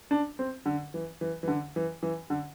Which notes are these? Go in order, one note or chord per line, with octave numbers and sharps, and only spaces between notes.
D4
C4
D3
E3
E3
E3
D3
E3
E3
D3